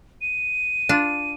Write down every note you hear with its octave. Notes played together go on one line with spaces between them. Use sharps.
D#7
D4 F4